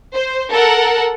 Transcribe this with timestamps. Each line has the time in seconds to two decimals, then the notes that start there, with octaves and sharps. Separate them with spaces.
0.14 C5
0.51 A4 A#4 F#5